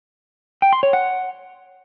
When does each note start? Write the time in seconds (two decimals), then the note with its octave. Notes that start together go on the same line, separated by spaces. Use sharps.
0.62 G5
0.73 C6
0.83 C#5
0.93 F#5